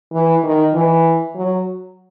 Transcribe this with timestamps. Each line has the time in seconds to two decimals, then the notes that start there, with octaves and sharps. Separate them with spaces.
0.12 E3
0.43 D#3
0.74 E3
1.36 F#3